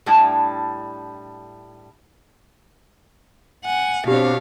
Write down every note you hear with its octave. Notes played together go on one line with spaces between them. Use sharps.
A2 G3 D4 E4 G5 A5
F#5 G#5
B2 C4 D4 G4 C#5 F5